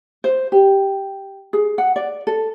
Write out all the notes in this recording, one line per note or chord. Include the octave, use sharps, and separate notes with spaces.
C5
G4
G#4
F#5
D5
A4